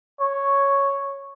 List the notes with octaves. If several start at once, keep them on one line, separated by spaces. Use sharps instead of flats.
C#5